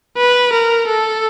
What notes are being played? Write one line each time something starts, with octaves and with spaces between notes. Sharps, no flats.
B4
A#4
A4